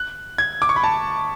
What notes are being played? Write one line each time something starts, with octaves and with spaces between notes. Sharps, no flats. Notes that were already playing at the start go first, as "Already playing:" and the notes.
Already playing: F#6
G#6
D6
C#6
B5
A5